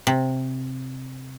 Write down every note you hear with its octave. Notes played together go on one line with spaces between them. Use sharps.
C3